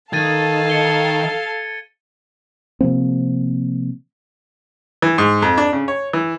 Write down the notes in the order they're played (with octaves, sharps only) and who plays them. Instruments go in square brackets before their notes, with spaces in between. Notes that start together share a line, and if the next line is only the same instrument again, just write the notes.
[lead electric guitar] D#3 [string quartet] A4 F5 A5 [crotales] G#6 A6 D#7
[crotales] C#7 G7
[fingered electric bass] C3 F3 A#3 C4
[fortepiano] E3
G#2
F2
D4
C#3
C#5
E3